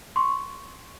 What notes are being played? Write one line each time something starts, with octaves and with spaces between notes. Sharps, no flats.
C6 C#6